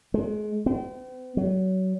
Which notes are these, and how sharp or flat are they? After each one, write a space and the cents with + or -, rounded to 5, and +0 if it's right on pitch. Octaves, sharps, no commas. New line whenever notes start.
G#3 +30
C4 -45
F#3 +25